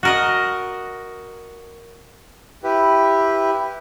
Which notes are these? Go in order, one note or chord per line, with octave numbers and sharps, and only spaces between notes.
F#4 A#4 D#5
E4 G4 B4